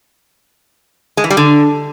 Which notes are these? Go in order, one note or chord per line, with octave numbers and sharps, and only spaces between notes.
G#3
E3
G3
D3